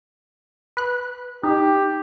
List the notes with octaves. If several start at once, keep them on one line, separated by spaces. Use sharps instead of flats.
B4 F#6
D#4 G4